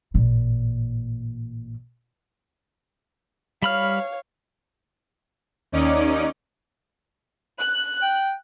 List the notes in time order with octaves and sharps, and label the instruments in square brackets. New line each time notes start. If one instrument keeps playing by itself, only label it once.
[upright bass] A1 A#2
[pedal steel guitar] G3 B5 F6 [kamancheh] C#5 F5
[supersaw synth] D#2 C#4 D#4 D5 D#5 D6
[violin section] F#6
[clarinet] G5